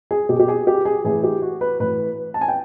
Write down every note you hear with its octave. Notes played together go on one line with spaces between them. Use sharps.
G#4
B2 G4
G4
G#4
G4
G#4
A2 E3 G#4
G4
F#4
B4
A2 E3 B4
A5
G#5
G5